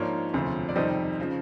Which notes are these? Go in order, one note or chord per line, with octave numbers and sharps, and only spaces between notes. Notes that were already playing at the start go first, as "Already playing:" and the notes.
Already playing: G#2 F3 A#3 D4 C#5
E1 D2 C3 F3
D5
F2 C3 D#3 G3 C4 D#5
C#3 F3